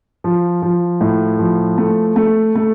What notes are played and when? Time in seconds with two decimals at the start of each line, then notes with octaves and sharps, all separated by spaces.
0.24 F3
0.62 F3
1.01 A2
1.39 F3
1.78 A3
2.16 A3
2.55 A3